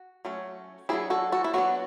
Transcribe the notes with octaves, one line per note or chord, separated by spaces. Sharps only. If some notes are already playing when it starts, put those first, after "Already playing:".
Already playing: F#4
F#3 A3 C#4
F#3 B3 D4 E4 G#4
F#4 A4
F#4 A4
E4
F#3 B3 D4 F#4